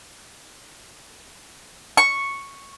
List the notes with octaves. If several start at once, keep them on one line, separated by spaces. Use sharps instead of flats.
C#6